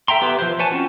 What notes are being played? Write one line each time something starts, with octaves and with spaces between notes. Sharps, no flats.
A4 E5 G5 A#5 C6
B3 G4 B4 E5
F3 B4 C5
B4 C#5 G#5 A5
C4 C#4 F4 F#4